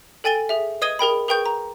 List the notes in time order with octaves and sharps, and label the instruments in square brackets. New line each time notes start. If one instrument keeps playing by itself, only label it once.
[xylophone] A4 G5 G#5 A6 D#7 G7
G#4 E5
B4 D#5 D#6 G#6 D#7 G7
G#4 A#4 G5 B5
G#4 A#4 B4 G5 C#6 G6
A#5